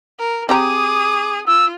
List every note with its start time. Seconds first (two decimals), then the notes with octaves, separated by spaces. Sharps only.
0.18 A#4
0.49 C4 G4 G#4 A#5 D6 D#6
1.47 F4 E6